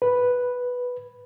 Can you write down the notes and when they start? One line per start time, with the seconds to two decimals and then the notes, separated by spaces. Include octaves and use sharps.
0.02 B4